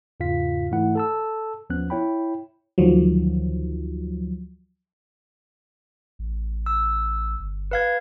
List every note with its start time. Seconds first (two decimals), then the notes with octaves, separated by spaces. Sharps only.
0.20 E2 G#2 C#3 F4 F5 B6
0.71 G#2 E3 A3 E4 F#5
0.95 A4 A5 E6
1.70 D#2 F3 B3 C#4 F#6
1.90 E4 C#5 G5 B5
2.78 D2 D#3 F3 F#3
6.19 A1
6.66 E6
7.40 G1
7.71 B4 F5 G#6